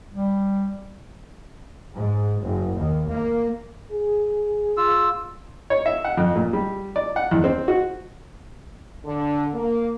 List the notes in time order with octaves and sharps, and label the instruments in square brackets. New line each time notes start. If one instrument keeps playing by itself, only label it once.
[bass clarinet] G3
[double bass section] G#2
F#1
D#2
A#3
[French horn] G#4
[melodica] F4 E6
[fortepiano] C#5
E5
F#5
F2
A#2
G3
D5
F#5
E2
C4
F#4
[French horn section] D3
A#3